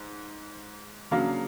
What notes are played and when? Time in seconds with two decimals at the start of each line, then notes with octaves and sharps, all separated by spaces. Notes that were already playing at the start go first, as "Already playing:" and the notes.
Already playing: G#2
1.11 C#3 F#3 A#3 D4 F5